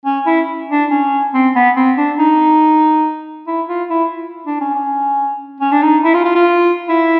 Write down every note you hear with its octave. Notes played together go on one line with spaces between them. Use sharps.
C#4
E4
D4
C#4
C4
B3
C4
D4
D#4
E4
F4
E4
D4
C#4
C#4
C#4
D4
D#4
E4
F4
F4
F4
E4